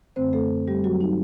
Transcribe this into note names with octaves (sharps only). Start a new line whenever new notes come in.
F#2 D3 A3 C4 C5
A3 A4
G3 G4
F#3 F#4
D#4